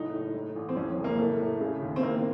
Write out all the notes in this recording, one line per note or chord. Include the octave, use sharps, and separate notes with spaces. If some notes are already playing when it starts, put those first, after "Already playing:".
Already playing: F#1 A2 D#4
A2
A2
A1
C4
F2 C#4
F#1
A#3
A2 A3
A2
C#3
D#2
C4
A2 A#3